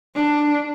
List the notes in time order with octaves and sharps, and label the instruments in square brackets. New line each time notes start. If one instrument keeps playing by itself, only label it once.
[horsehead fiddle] D4